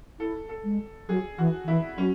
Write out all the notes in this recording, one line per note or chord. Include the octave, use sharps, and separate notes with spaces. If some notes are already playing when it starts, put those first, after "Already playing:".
E4 A4
A4
G#3
F#3 G#4
E3 F#4
D#3
E3 E4
F#3 C#4